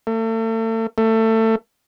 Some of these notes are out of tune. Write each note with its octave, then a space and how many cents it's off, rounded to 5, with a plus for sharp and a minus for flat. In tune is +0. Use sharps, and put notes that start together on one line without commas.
A3 +40
A3 +25